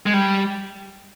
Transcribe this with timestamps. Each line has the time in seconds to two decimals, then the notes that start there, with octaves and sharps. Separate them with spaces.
0.06 G#3
0.13 G3